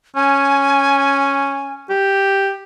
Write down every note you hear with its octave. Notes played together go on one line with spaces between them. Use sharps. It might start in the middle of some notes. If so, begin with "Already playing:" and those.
C#4 G#5
G4